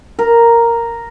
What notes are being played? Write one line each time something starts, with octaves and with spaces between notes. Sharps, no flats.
A#4